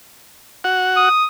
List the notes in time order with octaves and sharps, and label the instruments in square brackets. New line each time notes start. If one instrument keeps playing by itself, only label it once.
[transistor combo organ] F#4 F#5
[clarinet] D#6